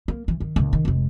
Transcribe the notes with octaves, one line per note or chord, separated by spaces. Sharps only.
A#3
E3
D#3
C#2 A#2
D#3
F1 G#3